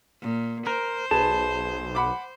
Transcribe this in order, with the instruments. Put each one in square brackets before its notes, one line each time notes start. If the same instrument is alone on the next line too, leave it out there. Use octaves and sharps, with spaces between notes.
[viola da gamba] A#2
[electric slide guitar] A#4 [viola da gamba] C5
[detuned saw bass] B1 [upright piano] G#4 B4 [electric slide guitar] A5
[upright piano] F#5 B5 D6